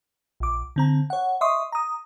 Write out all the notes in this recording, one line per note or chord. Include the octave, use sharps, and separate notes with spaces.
A#1 D6
D3 C4 A#5
C#5 F#5
D#5 E5 C6 C#6 D#6
A#5 D#6